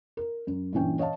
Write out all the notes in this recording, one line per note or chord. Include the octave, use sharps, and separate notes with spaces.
A#4
F#2
G2 A#2 E3 C#4 G5
C#5 D#5 F5 A5